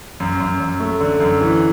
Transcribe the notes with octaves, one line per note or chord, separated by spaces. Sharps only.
F#2
F#2
F#2
A3
D3
F#2
E3